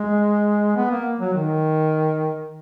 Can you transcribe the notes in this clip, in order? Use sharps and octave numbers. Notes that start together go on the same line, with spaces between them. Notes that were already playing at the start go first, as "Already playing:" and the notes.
Already playing: G#3
B3
A#3
F#3
D#3